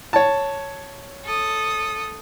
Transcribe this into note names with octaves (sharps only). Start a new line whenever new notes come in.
C#5 A5
A4 D#6